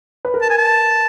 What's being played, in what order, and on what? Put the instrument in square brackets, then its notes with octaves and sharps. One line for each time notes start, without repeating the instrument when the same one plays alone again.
[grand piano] B4
A#4
[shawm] A5
G#5
A5